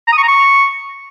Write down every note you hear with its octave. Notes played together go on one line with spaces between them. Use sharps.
A#5
D#6
C#6
A#5
C#6